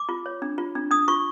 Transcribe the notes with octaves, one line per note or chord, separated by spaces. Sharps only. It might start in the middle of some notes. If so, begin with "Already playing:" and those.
Already playing: D6
F4
C#5
D4
F4
D4
D4 D#6
F4 C#6